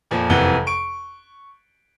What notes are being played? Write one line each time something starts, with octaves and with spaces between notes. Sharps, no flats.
F2 A#2 F3
F#1 F2 C3 E3 F#5 G7
C#6 D7